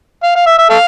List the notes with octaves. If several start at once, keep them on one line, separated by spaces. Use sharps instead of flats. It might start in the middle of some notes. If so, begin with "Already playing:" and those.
F5
F5
E5
E5
A4 F5